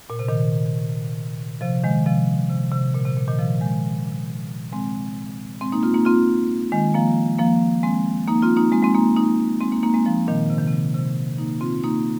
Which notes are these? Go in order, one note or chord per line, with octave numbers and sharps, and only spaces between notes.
A#2
C3
A#2 D#3
C3 F3
D#3 G#3
C3 F3
C3
C3
A#2
C3
A#2
A#2 D#3
C3 F3
D#3 G#3
G#3 C4
G#3 C4
A#3 D#4
C4 F4
A#3 D#4
C4 F4
D#3 G#3
F3 A#3
F3 A#3
G#3 C4
A#3 D#4
C4 F4
A#3 D#4
G#3 C4
G#3 C4
A#3 D#4
A#3 D#4
G#3 C4
A#3 D#4
A#3 D#4
G#3 C4
F3 A#3
A#2 D#3
C3
D#3
C3
C3
A#3 D#4
C4 F4
A#3 D#4